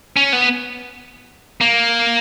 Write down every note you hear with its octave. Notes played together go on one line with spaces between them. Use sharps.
C#4
B3
A#3